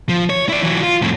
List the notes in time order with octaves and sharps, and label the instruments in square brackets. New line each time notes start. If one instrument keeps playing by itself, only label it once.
[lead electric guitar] F3
C#5
E4 D5
E3 F#3
F4
F2 A2